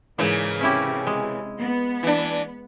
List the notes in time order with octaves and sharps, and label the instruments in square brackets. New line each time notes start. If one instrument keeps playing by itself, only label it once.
[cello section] G#2 [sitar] C#3 E3 A#3
[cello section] C3 [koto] C#4 E4 G4
[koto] G#3
[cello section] B3
[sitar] E3 D4